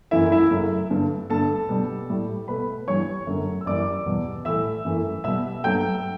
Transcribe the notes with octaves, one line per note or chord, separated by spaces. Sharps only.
F#2 E3 A3 E4 E5
E4 E5
F#2 C#3 F#3 A3
G2 D3 A3
G2 D3 A3 A4 A5
B2 G3
A2 G3
B2 A3 B4 B5
G2 E3 G3 C#5 C#6
F#2 D3 F#3 A3
E6
F#2 E3 G3 D5 D6
E2 B2 G3
A2 E3 A3 E5 E6
F#2 E3 A3
B2 G3 E5 E6
G2 F#3 A3 G5 G6